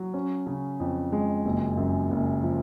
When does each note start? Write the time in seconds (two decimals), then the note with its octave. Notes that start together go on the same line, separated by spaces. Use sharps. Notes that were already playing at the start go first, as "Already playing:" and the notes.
Already playing: F#3
0.14 C#4
0.46 C#3
0.80 F2
1.12 G#3
1.45 F#1
1.77 F#2
2.11 F#1
2.43 F3